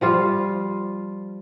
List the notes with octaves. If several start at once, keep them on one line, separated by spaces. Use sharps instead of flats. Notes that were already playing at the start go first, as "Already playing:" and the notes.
F3 G3 F4